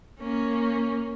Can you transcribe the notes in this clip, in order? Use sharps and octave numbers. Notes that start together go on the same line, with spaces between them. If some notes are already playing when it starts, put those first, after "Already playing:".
A#3 C#4